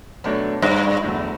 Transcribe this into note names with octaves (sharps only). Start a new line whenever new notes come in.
B2 F#3 A3 D4 A4 C#5
G2
E2 D3 F#3 A3 E4